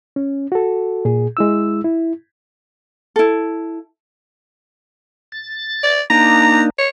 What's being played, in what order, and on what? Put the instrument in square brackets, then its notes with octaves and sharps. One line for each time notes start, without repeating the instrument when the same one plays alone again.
[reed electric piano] C#4
F#4 A4
A#2 G#4
G#3 E4 E6
E4
[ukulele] E4 A4
[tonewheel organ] A6
[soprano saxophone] D5
[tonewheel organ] A#3 D4 D#4 [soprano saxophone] A#5
[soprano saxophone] C#5